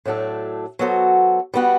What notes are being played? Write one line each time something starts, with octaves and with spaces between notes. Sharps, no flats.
A2 F#3 A3 D4 A4
F#3 B3 F#4 A4 C5
G3 B3 F#4